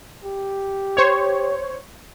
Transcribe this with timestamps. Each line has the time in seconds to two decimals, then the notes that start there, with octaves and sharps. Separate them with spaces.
0.24 G4
0.97 C5 C#5